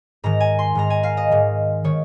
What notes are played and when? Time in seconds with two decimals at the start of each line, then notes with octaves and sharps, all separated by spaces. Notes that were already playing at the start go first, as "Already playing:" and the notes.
0.24 G#2 D#3 A#5
0.40 G#5
0.59 C6
0.75 G#2 D#3 A#5
0.90 G#5
1.03 F5
1.17 D#5
1.31 G#2 D#3
1.84 D#3 C#5